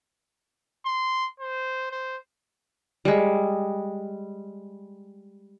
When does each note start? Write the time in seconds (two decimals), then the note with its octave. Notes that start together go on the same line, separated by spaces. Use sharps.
0.86 C6
1.40 C5
1.91 C5
3.05 G3 G#3